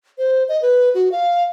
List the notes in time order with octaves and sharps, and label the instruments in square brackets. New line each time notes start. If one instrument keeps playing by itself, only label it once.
[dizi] C5
D#5
B4
F#4
F5